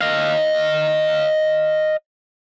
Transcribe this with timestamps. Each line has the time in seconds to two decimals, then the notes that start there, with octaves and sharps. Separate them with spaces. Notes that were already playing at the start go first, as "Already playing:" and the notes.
0.01 D#5 F5